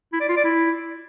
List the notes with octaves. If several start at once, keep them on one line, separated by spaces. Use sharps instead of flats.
E4
D5
F4
D5
E4